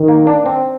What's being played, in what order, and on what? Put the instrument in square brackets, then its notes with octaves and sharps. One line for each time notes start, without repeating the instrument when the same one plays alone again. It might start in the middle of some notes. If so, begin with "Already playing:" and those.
Already playing: [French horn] D#3
[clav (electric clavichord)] A#3
D4
C4